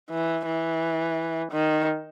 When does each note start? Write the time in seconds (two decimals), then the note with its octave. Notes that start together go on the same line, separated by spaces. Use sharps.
0.10 E3
0.46 E3
1.52 D#3